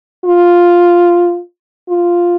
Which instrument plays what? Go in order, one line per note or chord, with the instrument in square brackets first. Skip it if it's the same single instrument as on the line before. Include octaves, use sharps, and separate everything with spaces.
[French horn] F4
F4